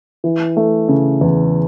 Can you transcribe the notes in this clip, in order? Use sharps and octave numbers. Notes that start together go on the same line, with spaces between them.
E3
A3
C#3
E2